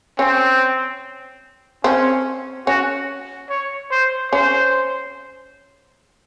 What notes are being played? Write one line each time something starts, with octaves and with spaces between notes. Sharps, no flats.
C4 C#4
C4 C#4
C#4 F#4
C#5
C5
C#4 C5